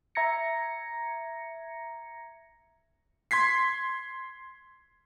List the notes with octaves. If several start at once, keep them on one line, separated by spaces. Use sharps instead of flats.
E5 A#5 G#6 A#6 C#7
C6 G#6 B6 C7